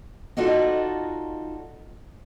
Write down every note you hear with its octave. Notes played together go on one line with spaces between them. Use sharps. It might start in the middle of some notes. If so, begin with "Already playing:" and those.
D#4 F4 F#4 A4 D5 D#5